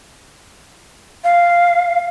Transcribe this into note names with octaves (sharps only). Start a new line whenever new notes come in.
F5